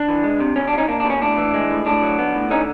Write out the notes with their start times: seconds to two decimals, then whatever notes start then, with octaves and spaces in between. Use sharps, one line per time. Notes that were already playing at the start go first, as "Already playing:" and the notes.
Already playing: D4
0.08 E3
0.24 G#3
0.40 C3
0.56 B2 C#4
0.67 D4
0.73 G3
0.78 C#4 D#4
0.88 A#3 D4
1.00 D4
1.05 B2
1.10 C#4
1.21 A2 D4
1.37 E3
1.54 G#3
1.71 A2
1.86 A2 D4
2.03 F#3
2.19 B3
2.34 A2
2.50 D3 C#4 D#4